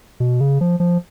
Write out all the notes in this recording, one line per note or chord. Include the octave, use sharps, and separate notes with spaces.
B2
C#3
F3
F3